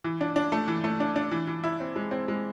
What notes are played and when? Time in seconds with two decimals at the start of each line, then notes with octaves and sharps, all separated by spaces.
0.04 E3
0.21 D4
0.36 D4
0.52 A3
0.68 E3
0.84 A3
1.00 D4
1.16 D4
1.31 E3
1.47 E3
1.64 E4
1.80 C4
1.96 G#3
2.11 C4
2.28 G#3